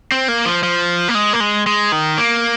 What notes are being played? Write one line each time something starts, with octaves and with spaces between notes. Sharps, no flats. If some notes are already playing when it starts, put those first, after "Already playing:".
C4
A#3
F3
F3
A#3
G#3
A#3
G#3
G#3
D#3
A#3